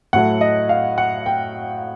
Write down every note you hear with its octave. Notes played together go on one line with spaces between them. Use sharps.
A2 F#3 A3 F#5
D#5
F5
F#5
G5